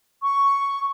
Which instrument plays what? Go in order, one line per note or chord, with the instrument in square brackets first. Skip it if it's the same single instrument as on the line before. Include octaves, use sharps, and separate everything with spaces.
[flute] C#6